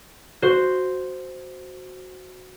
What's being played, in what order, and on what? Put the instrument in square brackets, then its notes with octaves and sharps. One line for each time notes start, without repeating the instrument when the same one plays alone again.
[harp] F#4 C5